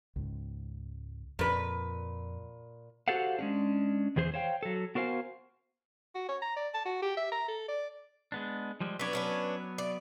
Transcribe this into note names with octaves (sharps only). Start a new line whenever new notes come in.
C#2 G#2
F2 A#2 B4
F#4 G4 A4 C5 F5 F#5
G#3 C#4 D4
E2 E3 G#4 C5
C5 C#5 F5 G5
F#3 A4
B3 F#4 A#4 C5 F5 G#5
F#4
C#5
A#5
D5
A5
F#4
G4
E5
A#5
A4
D5
G#3 B3 D4
F3 G3 G#3
F#3 B3 D4 B4 C#5
C#4 D4 B4
D5